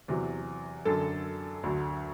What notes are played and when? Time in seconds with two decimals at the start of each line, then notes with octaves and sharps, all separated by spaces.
0.08 E2 C3 F#3
0.85 F#2 D3 F#3 A4
1.63 D2 D3 F#3